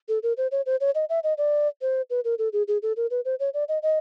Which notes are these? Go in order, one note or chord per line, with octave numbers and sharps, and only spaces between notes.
A4
A#4
C5
C#5
C5
C#5
D#5
E5
D#5
D5
C5
B4
A#4
A4
G#4
G#4
A4
A#4
B4
C5
C#5
D5
D#5
D#5